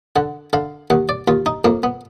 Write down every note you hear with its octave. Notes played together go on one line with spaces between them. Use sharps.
D3 F#5
D3 F5
D#2 F#5
D5
D#2 F4
D#4
F2 A#3
B3